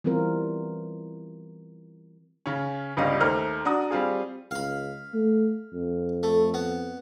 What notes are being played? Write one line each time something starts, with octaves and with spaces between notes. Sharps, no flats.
E3 G3 B3 C4 F4 A#4
C#3 C#4
G1 C#2 G3 D#5 F5
D#2 A3 C5 A#5 F6
D4 F#4 A#5 D#6
G3 C4 F4 G#4
C#2 F5 B5
A3
F2
A3
B3